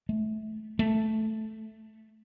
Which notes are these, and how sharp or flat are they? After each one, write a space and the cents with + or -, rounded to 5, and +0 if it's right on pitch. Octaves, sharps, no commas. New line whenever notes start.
A3 -25
A3 -5